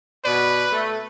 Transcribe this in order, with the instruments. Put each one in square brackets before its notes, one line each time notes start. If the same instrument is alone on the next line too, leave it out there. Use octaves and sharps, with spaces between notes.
[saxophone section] B2 D5 [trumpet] B4
[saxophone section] A3